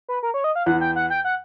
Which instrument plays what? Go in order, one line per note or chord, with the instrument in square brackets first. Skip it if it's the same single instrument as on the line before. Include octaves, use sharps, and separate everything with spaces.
[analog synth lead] B4
A#4
C#5
D#5
F5
[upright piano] E2 E3 [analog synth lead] F#5
[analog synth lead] G5
F#5
G5
F#5